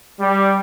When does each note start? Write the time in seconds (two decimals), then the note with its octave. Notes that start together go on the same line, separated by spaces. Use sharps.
0.20 G3